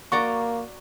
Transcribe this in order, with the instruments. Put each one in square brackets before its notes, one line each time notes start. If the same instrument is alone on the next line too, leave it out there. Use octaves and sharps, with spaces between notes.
[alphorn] A#3 [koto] F#4 D5 A#5 [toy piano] C#6